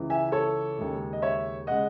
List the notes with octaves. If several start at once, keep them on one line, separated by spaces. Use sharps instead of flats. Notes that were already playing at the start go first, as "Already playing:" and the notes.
Already playing: C#2 C#3 E3
E5 G#5
A4 C#5
D#2 C#3 G#3
D#5
C#5 E5
C#3 G#3 D#5 F#5